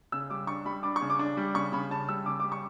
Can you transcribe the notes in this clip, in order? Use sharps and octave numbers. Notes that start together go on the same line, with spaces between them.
C#3 E6
G3 D6
D4 C#6
G3 B5
D4 D6
C#6
C#3
D6
D4
G3
C#3 C#6
C#3 B5
C#3 A5
G3 E6
C#3 D6
G3 D6
C#6